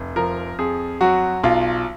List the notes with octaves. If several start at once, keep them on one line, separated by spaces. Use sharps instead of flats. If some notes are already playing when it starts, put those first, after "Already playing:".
Already playing: F1
F3 A#4
F2 G#4
F#3 F#4
B1 F4